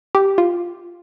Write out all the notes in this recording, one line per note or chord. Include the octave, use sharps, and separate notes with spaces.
G4
F4